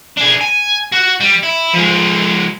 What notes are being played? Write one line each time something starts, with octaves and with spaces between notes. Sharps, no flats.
D4 G#4
G#5
F#4
G3
E4
F3 G#3